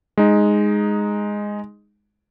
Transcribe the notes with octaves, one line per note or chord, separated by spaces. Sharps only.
G#3 D#4